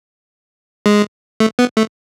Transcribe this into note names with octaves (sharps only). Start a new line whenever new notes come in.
G#3
A3
B3
A3